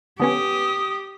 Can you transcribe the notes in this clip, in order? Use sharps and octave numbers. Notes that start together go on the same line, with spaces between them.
D3 B3 C#4 G4 D#6